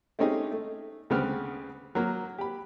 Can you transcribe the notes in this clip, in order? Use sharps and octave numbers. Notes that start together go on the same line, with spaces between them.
A3 C4 C#4 D#4 G4 G#4
A3
D2 C#3 B3 C4 F6
F#3 A#3
G4 B5